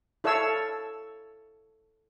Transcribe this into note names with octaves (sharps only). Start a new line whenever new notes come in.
E4 A4 C#5 F5 E6